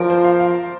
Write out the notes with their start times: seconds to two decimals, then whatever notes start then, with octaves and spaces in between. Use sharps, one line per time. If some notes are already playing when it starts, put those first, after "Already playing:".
Already playing: F3 A#4 D5
0.10 C5
0.24 F5
0.40 F5
0.54 F5